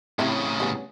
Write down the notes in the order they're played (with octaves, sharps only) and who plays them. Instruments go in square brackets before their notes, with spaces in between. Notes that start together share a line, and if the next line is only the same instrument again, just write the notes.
[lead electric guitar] A2 C#3 [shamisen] C4 E4 G4
[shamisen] G3 B3 C#4